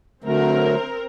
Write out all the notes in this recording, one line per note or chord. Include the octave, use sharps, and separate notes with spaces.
D3 F#3 A3 C4 A#4